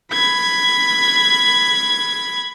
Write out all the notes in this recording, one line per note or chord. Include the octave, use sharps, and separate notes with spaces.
B5 G#6